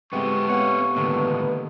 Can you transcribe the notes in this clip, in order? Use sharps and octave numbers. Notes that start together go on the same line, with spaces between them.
A2 G#3 B3 C4 E4 G4 C#6
B3 C4 G4 C#5 F5 F#5
C#2 A2 D3 D#3 A#3